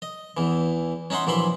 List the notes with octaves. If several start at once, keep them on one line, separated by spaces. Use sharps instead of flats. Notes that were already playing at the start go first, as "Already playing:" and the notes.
D#5
E2 E3
C#4 D#4 E5 F#5 C6
A#1 E3 F#3 E5 B5 C6